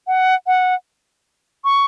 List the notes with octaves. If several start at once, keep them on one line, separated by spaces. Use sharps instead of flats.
F#5
F#5
C#6